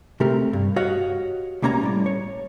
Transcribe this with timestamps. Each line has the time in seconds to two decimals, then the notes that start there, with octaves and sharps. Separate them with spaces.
0.20 C3 A3 C4 G4 A#4
0.53 G2
0.76 F#4 G4 C#5 D#5 F5 F#5
1.62 C2 G3 A#3 C#4 A#5
1.81 A2 G3 D5
2.06 C#5